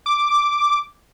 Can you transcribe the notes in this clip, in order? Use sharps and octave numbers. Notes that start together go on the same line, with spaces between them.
D6